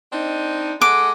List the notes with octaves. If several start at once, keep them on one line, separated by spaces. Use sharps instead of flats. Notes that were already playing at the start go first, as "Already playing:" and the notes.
C4 D4 D#4
G#3 A4 F#5 D6